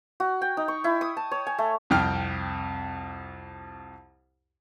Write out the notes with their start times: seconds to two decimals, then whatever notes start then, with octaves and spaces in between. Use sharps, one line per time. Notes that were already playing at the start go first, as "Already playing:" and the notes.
0.20 F#4
0.42 G5
0.57 D#4
0.68 C#6
0.84 E4
1.01 D#6
1.17 A5
1.32 C#5
1.47 G#5
1.58 A3
1.90 C2 F2 G5 F6